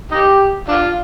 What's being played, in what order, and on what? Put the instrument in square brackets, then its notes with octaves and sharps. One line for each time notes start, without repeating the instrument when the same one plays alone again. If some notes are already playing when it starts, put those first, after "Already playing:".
[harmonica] D#4 G4
D4 F4